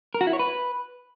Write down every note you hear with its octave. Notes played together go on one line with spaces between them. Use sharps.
A#4
F#4
E4
C#5
B4